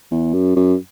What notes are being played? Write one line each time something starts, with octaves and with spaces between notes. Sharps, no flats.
E2
F#2
F#2